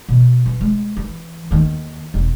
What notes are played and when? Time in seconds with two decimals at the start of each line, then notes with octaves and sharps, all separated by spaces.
0.09 B2
0.46 E3
0.61 G#3
0.97 E3
1.51 D#2 D#3
2.14 E1